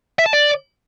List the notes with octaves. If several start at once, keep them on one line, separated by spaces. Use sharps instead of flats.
E5
A5
D5